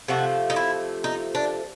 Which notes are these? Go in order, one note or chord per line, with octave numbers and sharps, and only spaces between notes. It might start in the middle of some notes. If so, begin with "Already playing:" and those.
C3 F3 A3 F#4
D#4
E4
D#4
D4